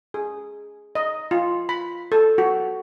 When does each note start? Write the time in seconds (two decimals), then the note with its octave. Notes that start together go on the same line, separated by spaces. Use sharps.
0.14 G#4
0.95 D#5
1.31 F4
1.69 B5
2.12 A4
2.38 F#4